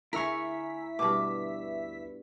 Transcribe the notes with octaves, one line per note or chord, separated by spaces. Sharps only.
D2 E4 G#4 A#4 E5 C#6 B6
G2 B2 D6